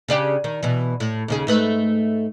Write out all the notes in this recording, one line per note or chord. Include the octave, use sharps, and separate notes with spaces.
C#3 D4 G4
D#3
B2 E3
A2
D#2 C#3 G#4
G#2 A3 B4